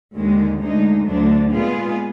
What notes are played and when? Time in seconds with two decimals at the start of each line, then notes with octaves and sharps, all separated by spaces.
0.14 D#2 D3 G#3
0.60 D2 D3 G#3 D#4
1.05 D2 D3 F#3 D4
1.51 A#2 G#3 B3 F4 G#4